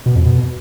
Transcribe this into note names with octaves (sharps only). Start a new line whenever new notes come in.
B2
F2
B2